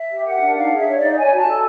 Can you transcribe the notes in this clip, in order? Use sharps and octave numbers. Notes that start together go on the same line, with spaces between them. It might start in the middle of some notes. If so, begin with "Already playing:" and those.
Already playing: E5
G4
A#4 F#5
D4
D#4 F5
G#4
E5
C#5
D5
D#4
C#5 G#5
F#4 A#5
A5
A4